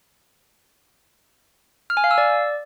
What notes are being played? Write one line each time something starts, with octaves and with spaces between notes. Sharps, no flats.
F6
G#5
F5
E6
D5